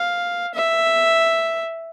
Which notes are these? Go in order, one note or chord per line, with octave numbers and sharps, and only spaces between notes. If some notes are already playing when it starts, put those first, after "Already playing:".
Already playing: F5
E5